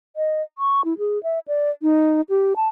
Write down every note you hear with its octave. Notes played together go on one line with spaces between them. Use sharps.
D#5
C#6
E4
G#4
E5
D5
D#4
G4
A5